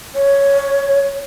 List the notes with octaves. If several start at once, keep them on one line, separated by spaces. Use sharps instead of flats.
C#5